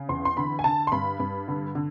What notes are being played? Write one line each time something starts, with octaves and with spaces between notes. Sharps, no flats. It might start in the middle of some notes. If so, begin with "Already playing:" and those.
Already playing: C#3
E2 C6
C6
D3 B5
G#5
D3 A5
C6
G2 B5
G2
D3
D3